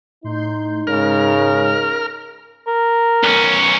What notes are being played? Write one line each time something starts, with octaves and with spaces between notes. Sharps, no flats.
A2 D#4 C6 G6
G#2 C#3 A#4 F6
A#4
B1 C#4